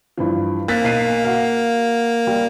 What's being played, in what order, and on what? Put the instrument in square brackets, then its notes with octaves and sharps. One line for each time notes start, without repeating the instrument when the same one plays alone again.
[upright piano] G2 E3 F3
[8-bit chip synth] A#3 [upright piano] F#6 A6 B6
[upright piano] B1 C7 D#7
F#4 F5
G3